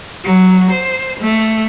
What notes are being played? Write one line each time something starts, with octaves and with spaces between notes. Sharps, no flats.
F#3
C5
A3